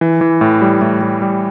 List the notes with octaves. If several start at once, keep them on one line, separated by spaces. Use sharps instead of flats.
E3
E3
A2
G3
A2
G3
G3